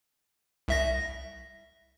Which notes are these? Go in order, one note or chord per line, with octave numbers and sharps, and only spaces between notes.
C2 E5 A#6